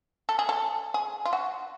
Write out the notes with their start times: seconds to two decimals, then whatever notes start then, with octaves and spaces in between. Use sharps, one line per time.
0.29 A4
0.39 G#4
0.49 A4
0.94 G#4
1.25 F4
1.33 F#4